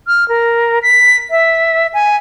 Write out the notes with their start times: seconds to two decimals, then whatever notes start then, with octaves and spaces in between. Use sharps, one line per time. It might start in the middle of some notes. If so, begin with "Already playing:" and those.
0.07 F6
0.29 A#4
0.83 B6
1.30 E5
1.94 G#5